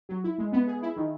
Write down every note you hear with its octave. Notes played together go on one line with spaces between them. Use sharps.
F#3
E4
G#3
B3
G#4
E4
D#3